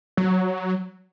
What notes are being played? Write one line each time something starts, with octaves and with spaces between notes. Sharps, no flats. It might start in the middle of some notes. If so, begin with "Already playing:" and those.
F#3